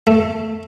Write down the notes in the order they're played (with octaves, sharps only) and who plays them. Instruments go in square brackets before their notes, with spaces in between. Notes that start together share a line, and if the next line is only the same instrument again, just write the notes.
[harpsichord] A3